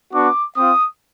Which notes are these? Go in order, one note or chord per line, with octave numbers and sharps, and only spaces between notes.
B3 D4 F#4 D6
C4 F4 D#6